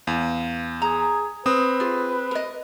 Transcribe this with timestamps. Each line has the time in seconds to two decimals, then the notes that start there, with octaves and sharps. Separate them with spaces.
0.07 E2 F5
0.82 G#4 A#5
1.46 C4 B4 D#6
1.80 F4 G#4
2.31 A#4 D#5